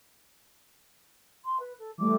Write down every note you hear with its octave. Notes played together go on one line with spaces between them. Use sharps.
C6
B4
A4
E3 G3 A3 D6